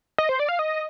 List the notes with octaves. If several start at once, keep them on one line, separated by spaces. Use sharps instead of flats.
D#5
C5
D5
F5
D#5